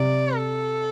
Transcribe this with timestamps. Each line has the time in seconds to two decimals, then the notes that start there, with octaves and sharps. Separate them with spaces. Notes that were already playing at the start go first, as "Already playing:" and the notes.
Already playing: C3 D5
0.36 A4